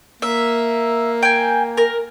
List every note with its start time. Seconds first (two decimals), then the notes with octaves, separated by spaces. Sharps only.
0.22 A#3 E5
1.23 G5 G#5
1.77 A#4